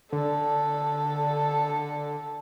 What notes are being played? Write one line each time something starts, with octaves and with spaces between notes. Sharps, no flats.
D3 A4